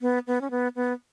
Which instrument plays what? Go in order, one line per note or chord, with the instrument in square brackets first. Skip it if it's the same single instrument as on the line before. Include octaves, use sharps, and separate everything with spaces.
[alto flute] B3
B3
C#4
B3
B3